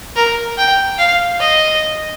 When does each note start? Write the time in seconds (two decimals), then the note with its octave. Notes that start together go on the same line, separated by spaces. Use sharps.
0.16 A#4
0.58 G5
0.98 F5
1.40 D#5